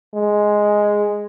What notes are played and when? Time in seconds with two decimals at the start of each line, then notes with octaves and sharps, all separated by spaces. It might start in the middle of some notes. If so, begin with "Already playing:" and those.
0.14 G#3